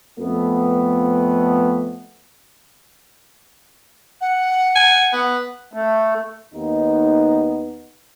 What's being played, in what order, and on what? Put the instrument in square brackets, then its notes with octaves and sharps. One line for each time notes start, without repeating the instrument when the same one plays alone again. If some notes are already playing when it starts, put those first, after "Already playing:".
[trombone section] F2 A3 B3
[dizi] F#5
[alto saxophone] G#5
B3
[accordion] A3
[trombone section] D#2 B3 D#4